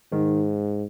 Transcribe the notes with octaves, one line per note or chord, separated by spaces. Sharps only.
G#2 D#3